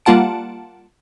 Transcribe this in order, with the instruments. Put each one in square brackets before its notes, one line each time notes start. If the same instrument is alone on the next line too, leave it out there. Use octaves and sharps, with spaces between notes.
[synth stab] G3 A#3 F4 F#5 A5 D7